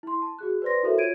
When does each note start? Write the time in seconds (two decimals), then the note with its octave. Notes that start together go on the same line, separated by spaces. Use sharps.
0.03 E4 C6
0.22 A5
0.39 F#4 G#4 F#6
0.62 B4 C5 D5 C6 A#6
0.83 E4 F#4 A4 A#4 C5 E5
0.98 F4 C#5 G#6 D7 D#7